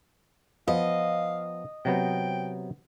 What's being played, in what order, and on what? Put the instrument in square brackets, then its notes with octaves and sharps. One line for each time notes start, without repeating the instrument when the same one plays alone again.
[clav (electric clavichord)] F3 B3 [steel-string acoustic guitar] D#5 [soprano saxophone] F5
[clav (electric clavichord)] C3 F#3 B3 [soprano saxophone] G5